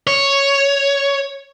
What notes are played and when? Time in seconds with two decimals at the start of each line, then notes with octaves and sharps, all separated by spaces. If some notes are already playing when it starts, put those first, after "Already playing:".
0.07 C#5